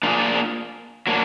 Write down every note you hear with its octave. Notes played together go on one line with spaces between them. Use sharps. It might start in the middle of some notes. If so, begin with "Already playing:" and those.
A#3 D4 F4 G#4 D5
F#3 A#3 D4